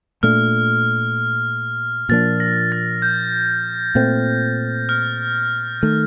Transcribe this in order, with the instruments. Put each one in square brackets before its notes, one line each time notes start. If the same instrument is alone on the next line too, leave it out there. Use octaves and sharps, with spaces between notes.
[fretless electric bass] A#2 A3 D4 [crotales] F6
[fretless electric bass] A#2 F3 A#3 D4 [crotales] A6
[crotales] A#6
A6
G6
[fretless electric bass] A#2 A3 C4
[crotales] F6
[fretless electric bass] D#3 A3